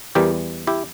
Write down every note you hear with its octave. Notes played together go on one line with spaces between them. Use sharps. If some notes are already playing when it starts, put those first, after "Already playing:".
E2 E3 G3 G4 A#4
E4 G4